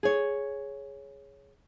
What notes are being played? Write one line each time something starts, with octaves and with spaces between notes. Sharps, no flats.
G#4 C#5